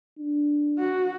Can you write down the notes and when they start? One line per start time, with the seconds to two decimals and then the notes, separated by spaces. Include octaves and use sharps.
0.19 D4
0.79 F#4